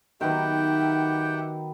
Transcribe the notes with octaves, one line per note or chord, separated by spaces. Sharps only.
D#3 F#3 B3 G4 E5 F#5 G5